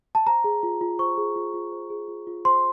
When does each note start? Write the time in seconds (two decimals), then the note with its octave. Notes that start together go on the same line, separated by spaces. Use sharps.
0.15 A5
0.26 C5 A#5
0.44 G#4
0.63 F4
0.81 F4
0.99 C5 C#6
1.18 G#4
1.36 F4
1.54 F4
1.72 C5
1.90 G#4
2.08 F4
2.27 F4
2.45 C5 C6